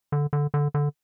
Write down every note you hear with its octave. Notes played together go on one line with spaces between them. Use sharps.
D3
D3
D3
D3